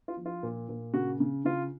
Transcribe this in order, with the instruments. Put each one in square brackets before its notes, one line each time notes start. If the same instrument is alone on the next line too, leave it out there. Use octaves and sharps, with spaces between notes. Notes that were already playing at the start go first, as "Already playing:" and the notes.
[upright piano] F4
F3
F4
A#2
A#2
C#3 F#4
C#3
C#3 F4